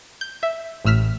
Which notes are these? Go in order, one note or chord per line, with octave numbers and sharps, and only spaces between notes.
G6
E5
A1 A2 E6 F6 B6